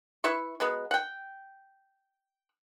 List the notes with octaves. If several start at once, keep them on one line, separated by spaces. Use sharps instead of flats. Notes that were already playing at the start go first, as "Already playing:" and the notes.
E4 B4 E5 C#6
F#3 G#3 B3
F#5 G5